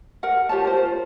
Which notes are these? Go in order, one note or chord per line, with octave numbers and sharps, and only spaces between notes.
A#4 F#5
F4 G4 C#5 A5
A#4 C5
F4